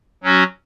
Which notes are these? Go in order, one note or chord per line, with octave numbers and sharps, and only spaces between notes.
F#3 C#4 F#4